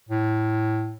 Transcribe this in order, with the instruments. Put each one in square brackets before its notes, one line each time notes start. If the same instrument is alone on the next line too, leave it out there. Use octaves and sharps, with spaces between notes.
[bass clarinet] A2